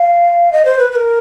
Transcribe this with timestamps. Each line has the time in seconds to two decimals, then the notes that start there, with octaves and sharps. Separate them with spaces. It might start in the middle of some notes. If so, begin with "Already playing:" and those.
Already playing: F5
0.52 D#5
0.65 C5
0.79 B4
0.92 B4
0.96 A#4